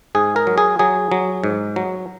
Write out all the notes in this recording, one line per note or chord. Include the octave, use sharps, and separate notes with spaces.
G#2 G#4
A#4
F#3
G#4
F#3 G#4
F#3
G#2
F#3